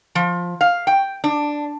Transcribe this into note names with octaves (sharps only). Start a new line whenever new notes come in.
F3
F5
G5
D4